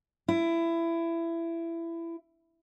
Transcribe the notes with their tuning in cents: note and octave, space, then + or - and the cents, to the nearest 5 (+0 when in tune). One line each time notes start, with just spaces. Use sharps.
E4 +20